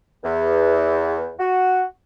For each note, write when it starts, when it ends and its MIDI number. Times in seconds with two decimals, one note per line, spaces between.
0.24 1.30 40
1.39 1.83 66